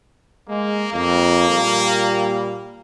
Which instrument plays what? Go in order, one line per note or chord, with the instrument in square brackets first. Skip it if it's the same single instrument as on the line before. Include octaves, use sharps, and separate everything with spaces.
[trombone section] G#3 [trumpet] A#3
[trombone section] F2 [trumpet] A#3
[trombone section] A#2 G3